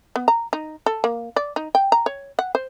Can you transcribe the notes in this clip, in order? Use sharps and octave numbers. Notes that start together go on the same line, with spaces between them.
B3
A#5
D#4
A4
A#3
D5
D#4
G5
A#5
C#5
F#5
C5